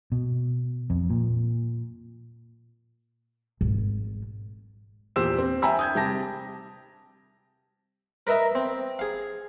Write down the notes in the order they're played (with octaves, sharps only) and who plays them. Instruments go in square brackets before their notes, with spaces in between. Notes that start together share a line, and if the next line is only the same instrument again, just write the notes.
[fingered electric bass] B2
F2
A#2
[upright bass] G#1
[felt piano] E2 A#2 G4 C5 E6 E7
C4
E5 G5 G#5 A#5 B5 E6
D#6 G6 G#6
C3 G3 G4 A5 A#6
[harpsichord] A#4 B4 D#5 E5 A#5
C4
G#4 F5